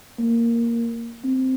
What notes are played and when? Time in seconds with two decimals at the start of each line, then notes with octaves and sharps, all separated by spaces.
0.19 A#3
1.24 C4